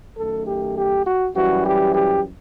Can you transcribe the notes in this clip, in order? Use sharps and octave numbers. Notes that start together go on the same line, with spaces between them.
F#2 D#3 A3 A4
G4
G4
F#4
F#2 E3 G3 F#4
G4
G4